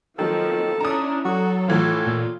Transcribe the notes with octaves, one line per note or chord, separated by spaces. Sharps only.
D#3 F3 F#3 A#3 C4 A4
C#4 D4 E4 A#5 D#6
F#3 F#4 A4
A2 E3 F3 F4
A#2